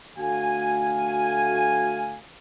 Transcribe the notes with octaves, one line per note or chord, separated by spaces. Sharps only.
D2 A3 F#4 F5 G#5